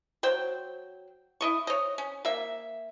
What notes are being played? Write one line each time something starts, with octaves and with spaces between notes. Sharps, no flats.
F#3 C5 G5
E4 D#5 C#6
C#5 D#5
C#4
A#3 E5